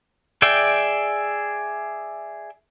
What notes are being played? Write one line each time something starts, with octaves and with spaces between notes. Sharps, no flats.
G#4 D5 E5 G5